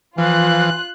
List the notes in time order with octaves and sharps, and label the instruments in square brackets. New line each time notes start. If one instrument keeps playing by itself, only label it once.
[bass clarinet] E3 [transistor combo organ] F3 [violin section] F4 F#6